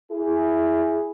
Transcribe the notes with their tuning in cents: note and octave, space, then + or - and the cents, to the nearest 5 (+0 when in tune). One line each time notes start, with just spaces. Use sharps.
E4 +0 G#4 +0